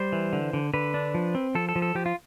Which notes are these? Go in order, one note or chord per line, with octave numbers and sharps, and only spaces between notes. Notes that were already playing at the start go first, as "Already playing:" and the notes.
Already playing: G3 C5
E3
D3
D3
D3 B4
D4
F3
C4
F3 A4
A4
F3
A4
F3 G4
F4